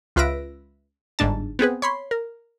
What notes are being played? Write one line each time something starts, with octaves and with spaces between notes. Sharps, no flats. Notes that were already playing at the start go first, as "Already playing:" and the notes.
C#2 F4 B4 E5 A#6 D7
G1 G#2 D4 A5
B3 C4 G#4 B4
C#5 B5 C6
A#4